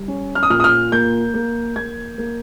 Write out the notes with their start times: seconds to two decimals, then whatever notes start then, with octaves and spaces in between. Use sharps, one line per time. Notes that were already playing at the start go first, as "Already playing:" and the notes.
Already playing: G3
0.08 C#4
0.35 F6
0.43 D#6
0.50 A#2 F6
0.60 D#6
0.64 F6
0.92 A#3 G6
1.34 A#3
1.76 A#3 G#6
2.18 A#3